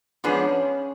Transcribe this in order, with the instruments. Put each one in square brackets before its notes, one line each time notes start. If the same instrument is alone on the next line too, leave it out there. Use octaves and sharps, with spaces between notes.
[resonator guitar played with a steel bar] G#2 F3 B3 D4 G#4 [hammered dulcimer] C#3 C#4